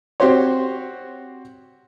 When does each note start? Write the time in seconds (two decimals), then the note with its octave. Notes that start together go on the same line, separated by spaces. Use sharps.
0.20 C4 F#4 G4 C5 C#5